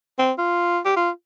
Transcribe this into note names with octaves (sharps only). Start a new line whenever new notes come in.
C4
F4
G4
F4